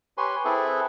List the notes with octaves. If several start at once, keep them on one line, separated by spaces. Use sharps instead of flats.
G4 B4 C#5 G#5 C6
C4 E4 G#4 A4 B4